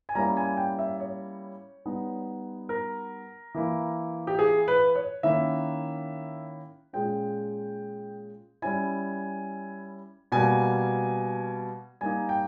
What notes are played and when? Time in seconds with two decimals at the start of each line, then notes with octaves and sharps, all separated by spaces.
0.09 G#5
0.15 G3 A#3 C#4 E4 A#5
0.37 G#5
0.57 G5
0.79 E5
1.00 C#5
1.85 G3 B3 D#4
2.69 A#4
3.55 E3 A#3 E4
4.27 G4
4.39 G#4
4.68 B4
4.95 C#5
5.23 D#3 A#3 C#4 E4 E5
6.93 A#2 G#3 C#4 G5
8.62 G3 C#4 E4 G#5
10.32 B2 G3 A#3 G#5
12.01 G3 A#3 D#4 G#5
12.29 G5